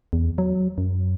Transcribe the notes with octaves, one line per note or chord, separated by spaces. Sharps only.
E2
F#3
F#2